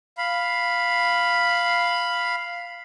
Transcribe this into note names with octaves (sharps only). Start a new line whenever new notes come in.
F5 B5